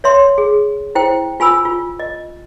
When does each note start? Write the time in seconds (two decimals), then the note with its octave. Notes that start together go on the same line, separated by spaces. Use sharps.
0.04 C#5 E5 C6
0.38 G#4
0.95 E4 C5 G5
1.40 F4 G#5 B5 E6
1.65 F4
2.00 D#5